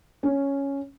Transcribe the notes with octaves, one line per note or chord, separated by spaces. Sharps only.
C#4